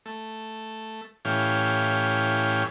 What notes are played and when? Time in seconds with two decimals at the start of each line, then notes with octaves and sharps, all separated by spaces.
0.06 A3
1.25 A2 E3 C#4 G4 F5